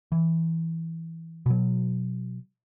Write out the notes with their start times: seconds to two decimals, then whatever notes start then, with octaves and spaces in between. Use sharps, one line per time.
0.12 E3
1.46 B2 F#3